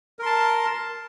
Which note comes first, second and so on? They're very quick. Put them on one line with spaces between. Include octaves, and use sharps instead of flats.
A#4 C6 A5